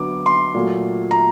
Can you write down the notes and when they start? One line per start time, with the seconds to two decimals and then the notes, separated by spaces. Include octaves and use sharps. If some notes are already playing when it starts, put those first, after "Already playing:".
Already playing: D3 F#3 B3 D6
0.26 C6
0.54 A#2 F#3 A3
1.11 A#5